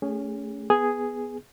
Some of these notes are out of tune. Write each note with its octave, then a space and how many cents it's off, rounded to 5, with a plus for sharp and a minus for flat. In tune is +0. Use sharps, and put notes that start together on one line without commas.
A3 +0 C#4 +20 G#4 -25
B3 +0 G#4 +0